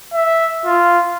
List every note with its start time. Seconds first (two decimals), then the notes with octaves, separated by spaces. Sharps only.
0.14 E5
0.66 F4